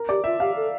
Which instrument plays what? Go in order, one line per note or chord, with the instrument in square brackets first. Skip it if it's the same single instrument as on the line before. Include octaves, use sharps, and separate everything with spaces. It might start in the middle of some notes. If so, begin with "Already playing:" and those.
Already playing: [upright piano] A#4
[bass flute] G4 [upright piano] D5
[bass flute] F4 [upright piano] E5
[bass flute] G4 [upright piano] F5
[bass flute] A4